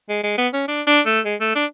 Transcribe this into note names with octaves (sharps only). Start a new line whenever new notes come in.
G#3
G#3
B3
C#4
D4
D4
A3
G#3
A3
D4